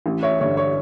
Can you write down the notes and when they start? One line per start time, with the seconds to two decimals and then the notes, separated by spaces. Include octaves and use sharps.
0.06 A1
0.23 C#5 E5
0.40 G2 D3 C#5
0.57 C#5